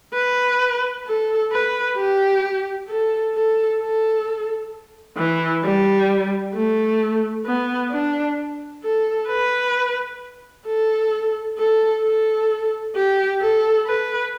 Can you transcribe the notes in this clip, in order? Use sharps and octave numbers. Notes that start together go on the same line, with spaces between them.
B4
A4
B4
G4
A4
A4
A4
E3
G3
A3
B3
D4
A4
B4
A4
A4
A4
G4
A4
B4